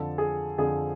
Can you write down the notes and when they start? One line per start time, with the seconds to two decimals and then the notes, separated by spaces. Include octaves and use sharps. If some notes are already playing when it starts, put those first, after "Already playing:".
Already playing: F2 D3 F3 A4
0.18 G#4
0.58 F2 D3 F3 G#4